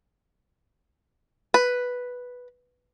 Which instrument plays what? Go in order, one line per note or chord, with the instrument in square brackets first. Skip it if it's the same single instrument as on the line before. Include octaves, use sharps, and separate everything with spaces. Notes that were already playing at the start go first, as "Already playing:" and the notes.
[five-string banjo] B4